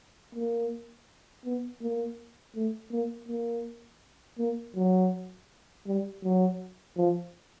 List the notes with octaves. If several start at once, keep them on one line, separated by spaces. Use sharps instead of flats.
A#3
B3
A#3
A3
A#3
A#3
A#3
F#3
G3
F#3
F3